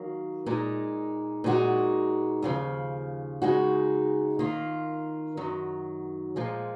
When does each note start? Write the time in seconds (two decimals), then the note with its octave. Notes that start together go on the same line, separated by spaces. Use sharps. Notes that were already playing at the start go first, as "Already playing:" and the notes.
Already playing: D#3 F#3 A#3
0.46 A#2 G#3 D#4
1.44 A#2 G#3 D#4 F#4
2.42 D#2 C#3 F3
3.42 C#3 G#3 D#4 F#4
4.39 D#3 A#3 F4
5.37 F#2 D#3 F#3
6.36 A#2 F3 G#3